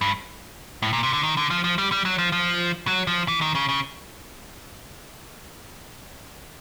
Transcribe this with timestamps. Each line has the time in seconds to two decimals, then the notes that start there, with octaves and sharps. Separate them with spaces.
0.01 G2
0.82 A2
0.93 A#2
1.03 C3
1.13 D3
1.23 D#3
1.37 D3
1.50 F3
1.64 F3
1.78 G3
1.92 G3
2.05 F#3
2.18 F3
2.32 F3
2.87 F#3
3.07 F3
3.28 E3
3.42 D#3
3.55 C#3
3.69 C#3